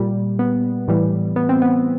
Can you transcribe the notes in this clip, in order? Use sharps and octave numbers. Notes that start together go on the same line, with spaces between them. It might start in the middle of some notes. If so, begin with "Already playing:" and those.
Already playing: A#2 G3
B3
A2 E3 G3
B3
C4
B3